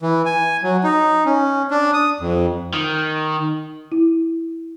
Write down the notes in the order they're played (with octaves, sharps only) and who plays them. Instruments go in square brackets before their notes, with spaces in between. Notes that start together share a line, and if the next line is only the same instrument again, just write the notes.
[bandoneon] E3
G#5
F#3
D#4
C#4
D4
D#6
F2
[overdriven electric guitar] D#3
[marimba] E4